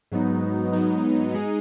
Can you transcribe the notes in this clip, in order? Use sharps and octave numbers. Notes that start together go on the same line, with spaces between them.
G#2 F#3 B3 D#4
G#2 F#3 B3 D#4
G#3 D#4 G#4